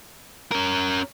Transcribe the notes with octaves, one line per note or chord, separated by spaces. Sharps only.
C#4 A#4